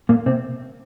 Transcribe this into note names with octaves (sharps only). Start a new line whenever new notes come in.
A#2 A#3
C3 C4